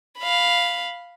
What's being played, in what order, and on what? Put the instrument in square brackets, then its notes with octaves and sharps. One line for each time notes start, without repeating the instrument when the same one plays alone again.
[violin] F5 B5